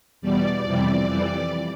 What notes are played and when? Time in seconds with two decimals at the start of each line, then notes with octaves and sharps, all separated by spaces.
0.22 E2 B2 G3 D5
0.65 F2 C3 E3 G3
1.07 F2 E3 G3